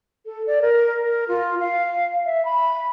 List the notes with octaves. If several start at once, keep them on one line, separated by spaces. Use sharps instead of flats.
A4
D5
A#4
A#4
F4
F5
E5
B5